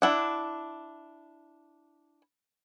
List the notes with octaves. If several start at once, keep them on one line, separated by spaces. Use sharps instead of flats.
D4 E4 F#5